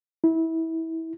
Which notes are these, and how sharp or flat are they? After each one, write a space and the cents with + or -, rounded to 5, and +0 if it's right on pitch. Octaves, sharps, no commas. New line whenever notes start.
E4 -25